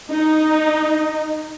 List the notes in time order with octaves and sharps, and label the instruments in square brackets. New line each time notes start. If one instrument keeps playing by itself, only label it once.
[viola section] D#4